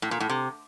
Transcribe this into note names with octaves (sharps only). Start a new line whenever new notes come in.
A2
A#2
A2
C3